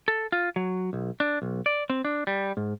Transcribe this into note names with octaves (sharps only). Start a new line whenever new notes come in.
A4
F4
F#3
B1
D4
B1
D5
C4
D4
G3
G#2